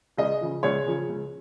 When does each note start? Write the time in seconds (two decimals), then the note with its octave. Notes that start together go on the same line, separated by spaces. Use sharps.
0.18 C#2 D#5
0.41 C#3 F3
0.63 C#2 C#5
0.86 C#3 F3
1.09 C#2